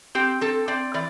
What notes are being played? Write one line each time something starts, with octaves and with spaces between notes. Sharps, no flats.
C4 G4
C4 A4
C4 D5
E3 D5